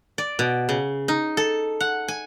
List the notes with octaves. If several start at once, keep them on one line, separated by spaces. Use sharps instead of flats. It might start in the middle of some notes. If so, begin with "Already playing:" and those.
D5
B2
C#3
D#4
A4
F#5
G#5